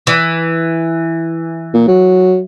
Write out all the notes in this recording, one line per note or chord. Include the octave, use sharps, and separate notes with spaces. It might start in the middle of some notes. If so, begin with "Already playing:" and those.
E3
A#2
F#3